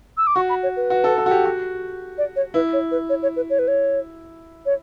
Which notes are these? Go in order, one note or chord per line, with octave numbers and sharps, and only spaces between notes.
E6
D6
F#4 C#6
B5
C#5
B4
F#4
A4
A4
F#4
G4
F#4
D5
C#5
E4 B4
C#5
B4
C#5
C#5
B4
C#5
B4
C#5
C#5